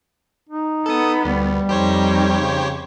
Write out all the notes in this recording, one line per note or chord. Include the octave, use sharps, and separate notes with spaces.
D#4
B3 A4 D#6
D2 G3
F2 D#4 G4 C5 C#5
C#3